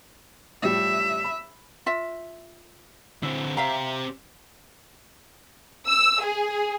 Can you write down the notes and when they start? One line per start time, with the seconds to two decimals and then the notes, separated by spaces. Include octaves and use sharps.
0.63 A2 F3 G3 E5
1.24 B5
1.86 F4 E5
3.23 D3 C4 E4
3.57 C4 G4 E5 F5 A#5
5.86 E6
6.22 G#4